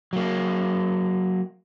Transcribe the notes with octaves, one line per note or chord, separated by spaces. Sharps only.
F#3 A#3